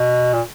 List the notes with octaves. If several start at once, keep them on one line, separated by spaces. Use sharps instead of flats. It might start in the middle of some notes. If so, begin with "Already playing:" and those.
Already playing: B2
A#2